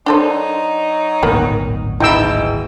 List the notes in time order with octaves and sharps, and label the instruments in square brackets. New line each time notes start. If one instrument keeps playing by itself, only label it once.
[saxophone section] F#3 D#4 [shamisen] D4 A4 C5
[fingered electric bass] D1 G#1 A#2 [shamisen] D#3 A#3 B3
[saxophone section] G#2 B2 [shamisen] D#4 [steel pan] E4 G5 E6